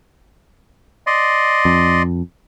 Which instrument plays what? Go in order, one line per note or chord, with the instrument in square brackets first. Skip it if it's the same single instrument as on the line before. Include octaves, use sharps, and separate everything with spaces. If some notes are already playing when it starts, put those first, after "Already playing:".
[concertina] D5 D#5 C6
[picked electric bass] F2